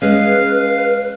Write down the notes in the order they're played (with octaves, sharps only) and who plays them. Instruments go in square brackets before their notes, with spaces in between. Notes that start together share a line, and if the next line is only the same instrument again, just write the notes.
[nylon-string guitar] G#3 C#4 [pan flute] B4 [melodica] F5